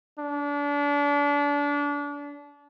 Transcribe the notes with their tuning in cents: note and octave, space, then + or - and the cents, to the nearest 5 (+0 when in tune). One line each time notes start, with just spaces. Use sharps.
D4 -30